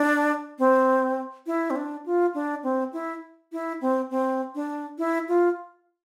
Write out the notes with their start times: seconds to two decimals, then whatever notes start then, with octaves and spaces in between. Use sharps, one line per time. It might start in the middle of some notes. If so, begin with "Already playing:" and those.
Already playing: D4
0.59 C4
1.47 E4
1.70 C4
1.76 D4
2.06 F4
2.35 D4
2.63 C4
2.93 E4
3.52 E4
3.81 C4
4.10 C4
4.55 D4
4.98 E4
5.28 F4